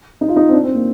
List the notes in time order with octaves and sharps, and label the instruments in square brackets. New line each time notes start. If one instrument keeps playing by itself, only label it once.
[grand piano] D#4
F4
D#4
C4
D4
C4
A#3